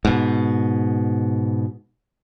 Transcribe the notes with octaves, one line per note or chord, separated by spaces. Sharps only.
G#2 B2